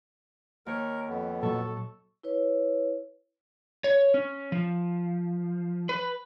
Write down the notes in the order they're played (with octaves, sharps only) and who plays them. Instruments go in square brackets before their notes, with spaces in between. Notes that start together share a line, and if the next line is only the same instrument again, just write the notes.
[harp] D#2 C#5 [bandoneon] A#4
[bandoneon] F2 B3
[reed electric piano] A#2 F#3 [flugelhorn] A4 [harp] C#6 E6
[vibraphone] E4 B4 C#5
[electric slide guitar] C#5
C#4
F3
B4